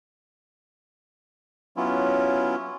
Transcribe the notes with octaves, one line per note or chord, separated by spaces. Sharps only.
F#3 B3 C#4 E4 F4